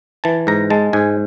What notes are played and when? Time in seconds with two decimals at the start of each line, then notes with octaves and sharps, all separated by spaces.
0.24 E3 A5
0.47 G#2 A#5
0.70 G#3 A5
0.93 G#2 G#5